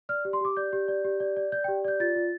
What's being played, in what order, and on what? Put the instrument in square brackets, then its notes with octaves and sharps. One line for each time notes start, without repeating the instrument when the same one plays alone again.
[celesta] D5 F6
G4
C6
G4 D6
D5 G6
G4
D5
G4
D5
D5
D5 G6
G4 G5
D5 G6
F4 A6
F4